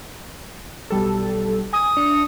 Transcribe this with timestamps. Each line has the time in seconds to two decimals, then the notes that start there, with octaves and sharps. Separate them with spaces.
0.90 B1 G3 A4
1.73 G#5 D#6
1.97 D4 C#7